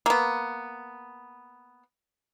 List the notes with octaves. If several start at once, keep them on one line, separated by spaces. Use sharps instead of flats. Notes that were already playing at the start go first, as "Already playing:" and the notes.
A#3 B3